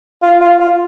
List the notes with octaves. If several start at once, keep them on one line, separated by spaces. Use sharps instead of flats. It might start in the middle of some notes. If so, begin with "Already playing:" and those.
F4
F4
F4